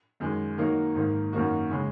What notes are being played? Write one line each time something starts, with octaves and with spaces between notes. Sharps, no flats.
F#2 D#3 G#3
D#3 F#3 A#3 D#4
G#2 D#3 A#3
F#2 D#3 A#3 D#4 F#4
C#3 G#3 C#4